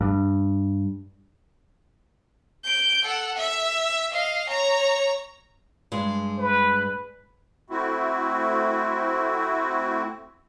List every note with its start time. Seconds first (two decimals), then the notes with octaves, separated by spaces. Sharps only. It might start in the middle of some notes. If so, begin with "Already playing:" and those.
0.01 G2
2.64 G6 D7
3.05 A4 F#5
3.37 E5
4.12 D#5 F5
4.49 C#5 A#5
5.92 G2 G#3
6.39 B4
7.70 A3 C4 E4 F#4